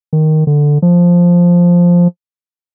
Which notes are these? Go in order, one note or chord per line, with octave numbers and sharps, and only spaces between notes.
D#3
D3
F3